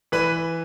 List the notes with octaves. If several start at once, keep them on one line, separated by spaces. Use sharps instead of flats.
E3 B4 B5